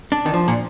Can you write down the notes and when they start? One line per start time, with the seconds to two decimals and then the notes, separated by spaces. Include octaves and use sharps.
0.12 D4
0.26 D#3
0.34 F3
0.48 A#2